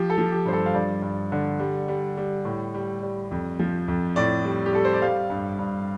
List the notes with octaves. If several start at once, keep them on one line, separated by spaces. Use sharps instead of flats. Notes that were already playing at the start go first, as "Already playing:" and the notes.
Already playing: F3 G4
A4
F3
G4
G2 C5
A4
F5
G2 D5
G2
D3
G3
G3
G3
A2
G3
G3
F2
F3
F2
A2 D5
G3
G4
G3 A4
C5
D5
G3 F5
G2
G2